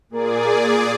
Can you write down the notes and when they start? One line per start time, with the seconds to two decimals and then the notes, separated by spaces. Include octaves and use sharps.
0.10 A#2 A#3 G#4 D5